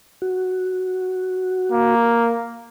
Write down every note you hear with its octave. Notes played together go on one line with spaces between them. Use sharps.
F#4
A#3